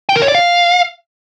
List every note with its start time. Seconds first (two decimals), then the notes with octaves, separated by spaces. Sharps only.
0.09 G5
0.16 A#4
0.22 C#5
0.28 D5
0.35 F5